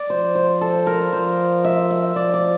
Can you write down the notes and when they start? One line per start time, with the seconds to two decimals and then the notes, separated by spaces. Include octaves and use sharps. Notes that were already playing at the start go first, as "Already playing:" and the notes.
Already playing: D5
0.10 F3 C5
0.35 C5
0.61 A4
0.87 A#4
1.12 F3 C5
1.64 E5
1.90 E5
2.16 F3 D5
2.34 D5